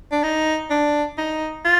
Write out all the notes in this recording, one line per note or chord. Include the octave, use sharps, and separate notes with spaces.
D4
D#4
D4
D#4
F4